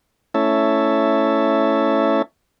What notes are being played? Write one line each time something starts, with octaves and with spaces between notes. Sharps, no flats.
A3 C#4 E4 C#5 E5 A5